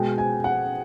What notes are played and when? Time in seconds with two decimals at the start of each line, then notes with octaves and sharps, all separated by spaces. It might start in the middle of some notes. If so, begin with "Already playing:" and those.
Already playing: B2 G#3 G5
0.18 G#5
0.44 F#5